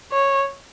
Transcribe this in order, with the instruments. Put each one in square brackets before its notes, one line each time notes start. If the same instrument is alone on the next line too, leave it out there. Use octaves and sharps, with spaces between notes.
[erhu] C#5